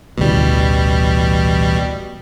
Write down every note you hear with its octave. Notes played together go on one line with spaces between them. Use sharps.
A1 D2 B2 E3 G3